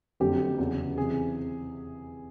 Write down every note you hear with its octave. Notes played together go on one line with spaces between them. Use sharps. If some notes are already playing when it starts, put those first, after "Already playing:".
F#1 F2 D3 F#3 G4
E2 C#3 F#3
C3 E3 G#4